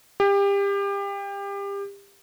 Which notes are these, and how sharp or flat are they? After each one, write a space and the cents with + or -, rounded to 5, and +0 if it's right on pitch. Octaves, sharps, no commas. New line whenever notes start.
G4 +30